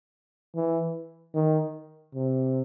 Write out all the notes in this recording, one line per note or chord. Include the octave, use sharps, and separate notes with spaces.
E3
D#3
C3